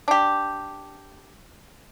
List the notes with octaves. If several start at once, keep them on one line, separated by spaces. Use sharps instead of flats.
D4 G4